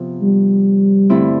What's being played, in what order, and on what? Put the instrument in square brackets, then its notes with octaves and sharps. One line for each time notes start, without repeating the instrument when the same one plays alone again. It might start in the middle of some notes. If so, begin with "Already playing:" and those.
Already playing: [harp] C3 F3 B3
[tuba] G3
[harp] G2 D3 A3 C4 E4